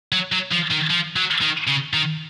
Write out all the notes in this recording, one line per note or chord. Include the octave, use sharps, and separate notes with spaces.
F#3
F#3
F3
D#3
F3
F#3
D#3
C#3
D#3